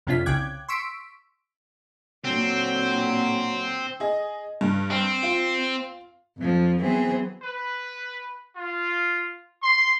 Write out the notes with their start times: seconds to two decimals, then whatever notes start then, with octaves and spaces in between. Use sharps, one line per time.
0.07 F2 C3 C#4 D4 F4 B6
0.26 C2 C#3 G5 D6 F#6 G#6
0.68 C6 C#6 E6 B6 D7
2.25 A#2 D3 F#3 C4
4.00 G#4 D#5
4.61 G2
4.91 C4
5.23 F4
6.37 F2 F3
6.80 E3 F#3 B3 C4 G#4
7.42 B4
8.55 F4
9.62 C6